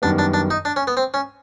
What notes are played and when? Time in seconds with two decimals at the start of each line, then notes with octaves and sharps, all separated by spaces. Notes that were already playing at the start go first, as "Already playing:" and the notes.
0.02 F#2 D#3 G3 B3 D4
0.19 D4
0.34 D4
0.50 D#4
0.65 D4
0.76 C#4
0.87 B3
0.97 C4
1.14 C#4